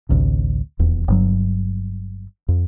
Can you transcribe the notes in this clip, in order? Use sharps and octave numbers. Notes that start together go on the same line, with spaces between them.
A1 D2 C3
D#1 E2
G1 G2 F#3
F2